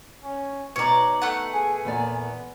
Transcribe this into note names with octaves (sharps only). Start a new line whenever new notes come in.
C#4
B2 D#4 B4 C#5 D5 A#5
A3 F#5
G#4 G#5
E2 A#2 B3 D5